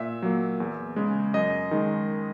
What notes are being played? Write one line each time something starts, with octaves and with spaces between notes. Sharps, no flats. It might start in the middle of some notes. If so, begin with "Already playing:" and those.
Already playing: A#2 E5
F#3 A#3
E2
C#3 G#3
F#2 D#5
D#3 G#3